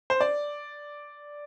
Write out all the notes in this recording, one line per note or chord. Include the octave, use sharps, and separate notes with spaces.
C5
D5